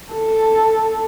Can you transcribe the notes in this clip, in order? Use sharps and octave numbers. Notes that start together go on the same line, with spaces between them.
A4